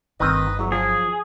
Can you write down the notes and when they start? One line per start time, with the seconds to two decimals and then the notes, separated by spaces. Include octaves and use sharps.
0.20 G1 D#3 C4 D#4 B4 D#5
0.59 E2 F#3
0.72 F3 G#4